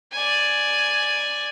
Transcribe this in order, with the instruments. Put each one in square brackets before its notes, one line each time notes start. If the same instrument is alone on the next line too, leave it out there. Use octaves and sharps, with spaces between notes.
[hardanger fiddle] D5 G#5